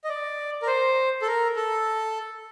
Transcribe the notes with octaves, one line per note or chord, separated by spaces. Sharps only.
D#5
D5
A#4
C5
A4
A#4
A4